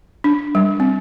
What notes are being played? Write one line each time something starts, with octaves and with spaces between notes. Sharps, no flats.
D4
G3
C4